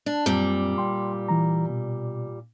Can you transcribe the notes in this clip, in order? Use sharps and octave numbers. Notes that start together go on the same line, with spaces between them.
D4
F#2 A#2 G3 C4
G5 C6
E3 A#5
B2